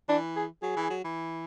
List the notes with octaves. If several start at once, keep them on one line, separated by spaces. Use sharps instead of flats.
E3 D4
G#4
F#3 G#4
E3
F#3
E3